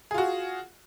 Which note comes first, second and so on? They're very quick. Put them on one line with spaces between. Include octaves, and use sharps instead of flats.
G#4 F4 F#4